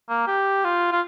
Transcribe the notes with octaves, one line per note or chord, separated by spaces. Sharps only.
A#3
G4
F4
F4